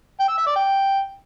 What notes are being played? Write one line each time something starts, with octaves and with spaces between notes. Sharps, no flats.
G5
E6
E5
D5
G5